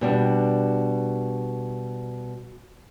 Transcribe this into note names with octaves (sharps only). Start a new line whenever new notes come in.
B2 G3 D4